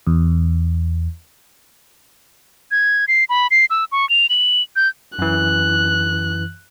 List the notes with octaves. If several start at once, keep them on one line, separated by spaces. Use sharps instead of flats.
E2
G#6
C7
B5
C7
E6
C#6
F7
F#7
G6
F#2 E3 F#6